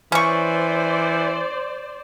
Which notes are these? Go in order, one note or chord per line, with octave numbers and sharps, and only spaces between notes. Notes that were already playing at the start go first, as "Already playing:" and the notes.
E3 C#4 C5 D5 C#6